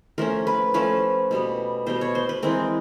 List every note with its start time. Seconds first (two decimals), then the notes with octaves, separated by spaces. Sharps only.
0.18 F3 A3 C#4 A#4
0.47 B4
0.74 F3 A3 C#4 B4
1.31 B2 G3 B3
1.86 B2 G3 B3 C5
2.01 C#5
2.15 C5
2.29 B4
2.43 E3 G#3 C4 A#4